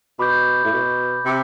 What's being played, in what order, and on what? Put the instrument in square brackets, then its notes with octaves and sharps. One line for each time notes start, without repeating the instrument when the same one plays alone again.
[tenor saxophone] B2 [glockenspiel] B5 D6 G6
[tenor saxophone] A2
B2
C3